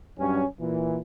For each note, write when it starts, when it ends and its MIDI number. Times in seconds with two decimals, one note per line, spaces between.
0.18 0.45 43
0.18 0.45 54
0.18 0.45 61
0.60 0.99 46
0.60 0.99 52